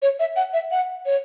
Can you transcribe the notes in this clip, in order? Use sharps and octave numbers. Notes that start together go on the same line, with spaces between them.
C#5
E5
F#5
E5
F#5
C#5